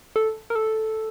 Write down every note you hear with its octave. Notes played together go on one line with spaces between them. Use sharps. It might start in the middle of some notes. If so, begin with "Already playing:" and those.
A4
A#4
A4